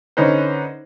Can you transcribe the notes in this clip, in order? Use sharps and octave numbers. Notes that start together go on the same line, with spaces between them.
D3 C#4 D#4 B4 C5